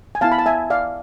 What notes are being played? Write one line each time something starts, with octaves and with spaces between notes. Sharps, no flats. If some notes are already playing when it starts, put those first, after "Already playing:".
G#5
B3 E4 F5 A5
B5
A5
E5 G#5
D5 F5